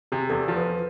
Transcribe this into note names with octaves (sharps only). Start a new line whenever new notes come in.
C3 G#4
E2 A4
F3
B4